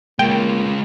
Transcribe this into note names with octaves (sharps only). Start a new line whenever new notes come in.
G#3 A#3 F4 G5